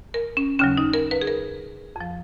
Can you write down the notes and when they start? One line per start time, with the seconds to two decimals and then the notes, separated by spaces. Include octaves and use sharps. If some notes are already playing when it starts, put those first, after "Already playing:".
0.14 A#4
0.37 C#4
0.59 D#2 C#3 F#3 C#4
0.77 D#4
0.93 A#4
1.11 B4
1.21 G#4
1.27 A#4
1.96 F2 F3